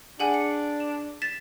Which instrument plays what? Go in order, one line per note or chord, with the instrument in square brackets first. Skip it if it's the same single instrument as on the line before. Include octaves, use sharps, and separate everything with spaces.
[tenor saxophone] D4 [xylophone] G#4 F#5 G#5
[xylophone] C#7
E7
A6 B6 E7